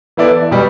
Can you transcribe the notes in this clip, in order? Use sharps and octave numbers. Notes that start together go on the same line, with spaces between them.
E3 B3 E4 A4 D5
B2 G3